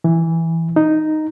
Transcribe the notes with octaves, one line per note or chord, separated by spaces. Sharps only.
E3
D#4